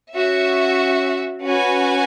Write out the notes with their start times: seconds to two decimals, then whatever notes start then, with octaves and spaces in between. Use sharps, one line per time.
0.14 C#4 F#4 E5
1.44 C#4 F#4 B4 G#5